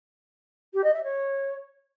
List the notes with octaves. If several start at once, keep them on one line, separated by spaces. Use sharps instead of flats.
G4
D#5
E5
C#5